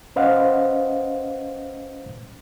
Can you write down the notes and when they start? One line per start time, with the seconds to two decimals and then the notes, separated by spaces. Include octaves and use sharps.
0.16 C#4 B4 C5 D#5 F5 F#5